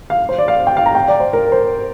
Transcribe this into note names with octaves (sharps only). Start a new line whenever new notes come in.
F5
C5
D5
F5
G5
F5
A#5
G5
D5
C5
A#4
C5